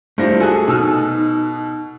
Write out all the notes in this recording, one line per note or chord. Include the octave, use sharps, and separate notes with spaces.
G2 A3 E4 F4 C5 A#6
F#4 G#4 A4 G#5 F#6
B2 D#4 E6 F6